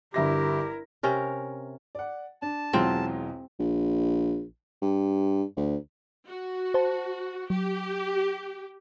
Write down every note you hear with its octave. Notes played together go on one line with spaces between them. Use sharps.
G1 E4 G4 A#4 E5 A#6
C3 C#4 A#4
D5 F#5
D4 A5
B1 E2 F#3 G#3 C4 F4
A#1
G2
D2
F#4
C5 A5
F#3 G4